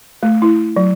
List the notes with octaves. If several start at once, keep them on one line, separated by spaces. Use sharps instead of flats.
A3
E4
F#3